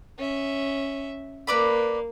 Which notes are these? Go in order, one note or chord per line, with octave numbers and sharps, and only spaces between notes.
C#4 E5
A#3 B4 D5 B5